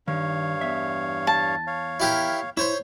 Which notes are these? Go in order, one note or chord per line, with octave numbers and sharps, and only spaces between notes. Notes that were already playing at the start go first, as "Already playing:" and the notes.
G2 D#3 C#5 F5
E2 E5
A5
C#5 F5
E4 G4 A#4
E4 C5 C#5